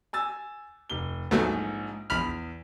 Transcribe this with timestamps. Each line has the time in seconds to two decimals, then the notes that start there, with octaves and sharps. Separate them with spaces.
0.13 G#5 E6 A6
0.90 F1 G7
1.31 A#1 G#2 F#3 A3 B3
2.10 A#1 E2 B5 F6